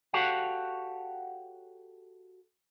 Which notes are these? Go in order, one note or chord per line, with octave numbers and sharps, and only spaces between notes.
F#4 G4 A4 C#5 F5 F#5